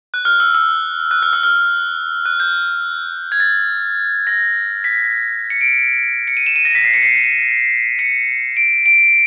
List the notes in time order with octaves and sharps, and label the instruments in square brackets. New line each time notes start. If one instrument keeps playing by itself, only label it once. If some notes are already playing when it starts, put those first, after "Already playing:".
[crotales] F#6
F6
E6
E6
F#6
F6
E6
F6
F#6
G6
G#6
A6
A#6
B6
C#7
D7
C#7
D#7
E7
D#7
A#6
B6
C7
C#7
C7
C#7
D7
D7